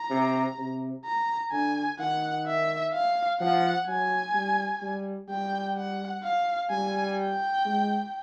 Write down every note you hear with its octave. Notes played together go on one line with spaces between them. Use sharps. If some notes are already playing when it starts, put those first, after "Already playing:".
Already playing: A#5
C3
C3
A#5
D3 G#5
D#3 F#5
E5
F5
F3 F#5
F#3 G#5
G3
G3
G3 G5
F#5
F5
G3 G#5
G5
G#3